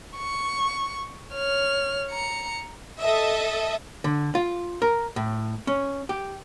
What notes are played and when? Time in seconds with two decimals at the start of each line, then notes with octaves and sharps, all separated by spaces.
0.17 C#6
1.34 C#5 F6
2.11 A#5 C#7
3.00 A4 D#5 E5
4.04 D3
4.35 F4
4.82 A#4
5.16 A2
5.67 C#4
6.09 G4